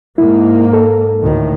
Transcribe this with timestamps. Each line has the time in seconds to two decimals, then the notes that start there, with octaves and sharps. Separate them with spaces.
0.18 G#2 A#3 E4
0.73 A4
1.21 D2 A2 D#3